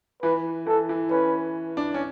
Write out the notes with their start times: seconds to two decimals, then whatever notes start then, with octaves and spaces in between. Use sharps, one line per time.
0.23 E3 B4
0.67 E3 A4
0.89 E3
1.11 C#4 B4
1.77 D4
1.94 C#4